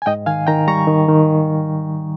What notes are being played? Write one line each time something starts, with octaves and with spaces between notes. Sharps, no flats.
G#5
G#2 D#5 G5
D#3 F5 G#5
D#3 G5 A#5
G3 A#5 C#6
D#3
D#3